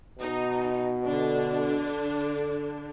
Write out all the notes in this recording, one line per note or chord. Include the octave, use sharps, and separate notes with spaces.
B2 D#4
D3 D4